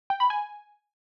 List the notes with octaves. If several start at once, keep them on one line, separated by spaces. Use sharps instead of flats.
G5
B5
G#5